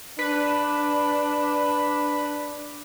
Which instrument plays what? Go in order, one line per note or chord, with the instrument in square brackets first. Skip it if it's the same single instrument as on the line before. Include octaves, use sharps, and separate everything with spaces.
[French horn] D4 [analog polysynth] B4